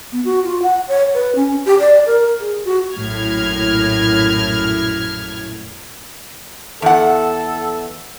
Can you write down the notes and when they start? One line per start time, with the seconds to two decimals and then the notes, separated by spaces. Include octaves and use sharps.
0.12 B3
0.25 F#4
0.44 F4
0.62 F#5
0.88 C#5
1.14 B4
1.36 C#4
1.66 G4
1.79 D5
2.06 A#4
2.40 G#4
2.65 F#4
2.95 A#1 F#2 A2 F6 G#6
6.82 E2 A4 F#5